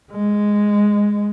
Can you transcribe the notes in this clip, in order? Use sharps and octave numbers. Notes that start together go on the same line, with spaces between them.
G#3